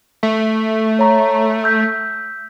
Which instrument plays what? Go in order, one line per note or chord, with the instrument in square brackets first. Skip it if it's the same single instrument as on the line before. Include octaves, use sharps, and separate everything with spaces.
[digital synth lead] A3
[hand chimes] C#5 A#5 C#6
E6 G6 B6